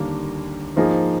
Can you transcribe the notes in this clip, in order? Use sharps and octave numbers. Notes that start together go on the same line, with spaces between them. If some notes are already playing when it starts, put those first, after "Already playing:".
Already playing: D#2 D3 G3 A#3 D4
G#2 F3 A#3 D#4 G#4